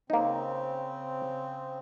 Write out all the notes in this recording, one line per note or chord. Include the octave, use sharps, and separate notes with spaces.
C#3 A#3 C4 D#4